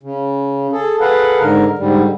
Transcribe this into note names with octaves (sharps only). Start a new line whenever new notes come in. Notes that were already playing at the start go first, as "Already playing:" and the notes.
C#3
G#4 A4
G#4 A4 B4 F5 F#5
G#2 D3 A#4
G#2 D3 G3